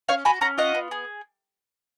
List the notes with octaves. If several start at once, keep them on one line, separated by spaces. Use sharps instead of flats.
C#4 C#5 F5
F#4 G#5 B5
C#4 F#5 A#5
F4 D#5 F#5
B3
G#4